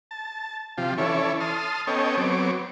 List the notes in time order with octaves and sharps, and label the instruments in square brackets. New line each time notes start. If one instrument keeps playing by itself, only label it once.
[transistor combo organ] A5
C3 F3 F4 G4
E3 C#4 E4 A4 C#5 D5
A5 C6 D#6 F6
B3 C#4 A4 C#5 D#5 G5
F#3 B3 C4 C#5 D6